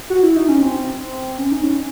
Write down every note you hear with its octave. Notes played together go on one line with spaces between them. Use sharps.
F#4
E4
D#4
C#4
C4
C#4
D#4
C#4